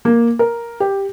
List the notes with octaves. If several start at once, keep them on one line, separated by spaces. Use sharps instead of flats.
A#3
A#4
G4